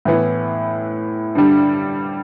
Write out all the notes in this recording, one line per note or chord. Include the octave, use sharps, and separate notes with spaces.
A2 E3 B3 E4
G2 D3 G3